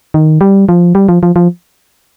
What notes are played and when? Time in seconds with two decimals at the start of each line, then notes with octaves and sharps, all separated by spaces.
0.14 D#3
0.41 G3
0.69 F3
0.95 G3
1.09 F3
1.23 F3
1.36 F3